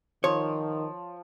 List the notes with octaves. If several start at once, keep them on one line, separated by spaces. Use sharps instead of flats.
D#3 F3 C#5